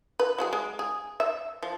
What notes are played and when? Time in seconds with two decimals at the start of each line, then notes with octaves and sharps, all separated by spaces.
0.20 B4
0.38 F#3 F#4 G#4
0.53 G#3
0.79 G#4
1.20 E5
1.63 F3